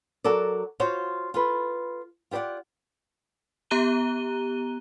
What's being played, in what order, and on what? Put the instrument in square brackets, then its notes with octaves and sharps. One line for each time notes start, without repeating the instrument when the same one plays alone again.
[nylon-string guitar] F#3 F#4 A4 A#4 D5
F4 F#4 C5 C#5 F5
F4 A4 B4
F4 G4 C5 D5 F#5
[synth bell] B3 G4 A#5 F#6 D#7 G7